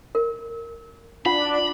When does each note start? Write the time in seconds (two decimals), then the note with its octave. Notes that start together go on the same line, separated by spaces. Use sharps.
0.15 A#4
1.26 D4 F4 F#5 B5